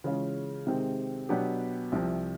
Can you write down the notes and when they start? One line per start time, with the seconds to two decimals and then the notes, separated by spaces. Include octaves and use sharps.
0.04 C#3 E3 G#3 C#4 F4
0.67 C3 D#3 G#3 C4
1.29 B2 F#3 B3 D4 G4
1.92 C2 C3 F3